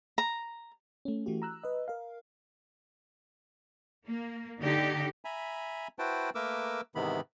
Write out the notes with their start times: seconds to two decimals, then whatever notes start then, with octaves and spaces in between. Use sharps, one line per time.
0.18 A#5
1.05 A3 C#4
1.26 E3 A3 F#4 G4
1.42 A#5 E6 F#6
1.64 B4 D#5
1.88 A#4 F5
4.08 A#3
4.60 D3 D#4 G4
5.25 E5 G#5 A#5 B5
5.99 E4 F#4 B4 C5 G5 A5
6.35 A3 A#3 A#4 B4 D6 E6
6.95 G#2 C3 D#3 E3 B3 B5